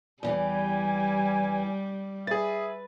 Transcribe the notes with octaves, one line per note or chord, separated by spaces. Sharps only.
E2 E3 G3 G4 G#5
G#4 B4 E5 A6